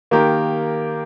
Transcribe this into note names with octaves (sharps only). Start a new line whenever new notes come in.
D#3 A#3 G4 A#4